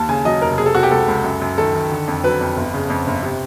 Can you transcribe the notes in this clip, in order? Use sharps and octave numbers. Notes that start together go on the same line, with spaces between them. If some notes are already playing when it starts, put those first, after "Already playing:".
Already playing: D#2 A5
C#3 G#5
F#3 D#5
F1 A#4
C3 G#4
A4
C3 F#4
G4
C#2 A4
C#2
F#2
F#2
D#3 A4
D#3
D3
F2
F#3 B4
F2
G1
C#3
F2
G1
C3